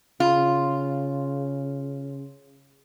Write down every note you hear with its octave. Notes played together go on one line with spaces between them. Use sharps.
C#3 F4